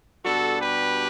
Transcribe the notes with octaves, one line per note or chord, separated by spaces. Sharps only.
B2 G3 D4 F#4 A4
G4 B4